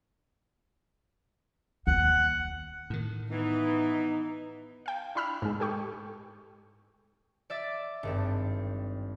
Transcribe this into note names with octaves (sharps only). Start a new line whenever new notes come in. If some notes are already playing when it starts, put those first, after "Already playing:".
D#2 F#5
A2 D#3
E3 B3 D#4
F5 G5
D4 E4 B5 E6 F6
G#2 G#3
G4 A4 G5 C#6
D5 E5 D6 A6
G#1 G2 C4